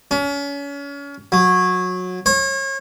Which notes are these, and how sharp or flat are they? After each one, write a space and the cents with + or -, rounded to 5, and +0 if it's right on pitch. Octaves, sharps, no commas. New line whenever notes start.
C#4 +35
F#3 -20
C#5 -35